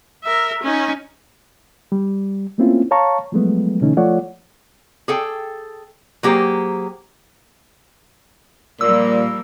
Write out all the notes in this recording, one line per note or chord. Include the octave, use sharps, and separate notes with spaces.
A#4 E5
C#4 D#4
G3
A3 A#3 C4 C#4 E4 F4
C#5 F5 A5 A#5 C#6
F3 F#3 G#3 A3 B3
B2 D3 E3 A3 C#4 D#4
F3 A3 F4 C#5 D5 F#5
G#4 A4 G5
F#3 A#3 G4 G#4 C5
A#2 F3 G3 A#3 E6